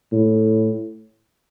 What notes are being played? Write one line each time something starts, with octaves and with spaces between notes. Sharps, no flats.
A2